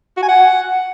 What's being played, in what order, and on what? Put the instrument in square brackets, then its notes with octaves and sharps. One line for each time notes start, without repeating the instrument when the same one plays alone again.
[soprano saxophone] F#4
G#5
F#5